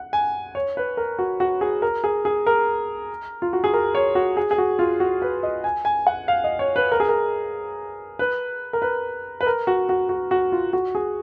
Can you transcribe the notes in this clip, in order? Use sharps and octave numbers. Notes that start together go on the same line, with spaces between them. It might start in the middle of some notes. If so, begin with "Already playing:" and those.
Already playing: F#5
G#5
C#5
B4
A#4
F#4
F#4
G#4
A#4
G#4
G#4
A#4
F4
F#4
G#4
A#4
C#5
F#4
G#4
G#4
F#4
F4
F#4
B4
D#5
G#5
G#5
F#5
F5
D#5
C#5
B4
A#4
G#4
A#4
B4
A#4
B4
B4
A#4
F#4
F#4
F#4
F#4
F4
F#4
G#4